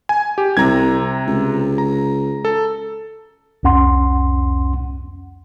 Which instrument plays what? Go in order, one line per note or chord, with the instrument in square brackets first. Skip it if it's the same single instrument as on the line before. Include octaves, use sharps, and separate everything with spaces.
[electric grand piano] G#5
G4
[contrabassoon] C2 [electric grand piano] C3 A#5 G#6
[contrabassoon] C#2
[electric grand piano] A#5
A4
[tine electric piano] C2 F2 C#4 F#5 C6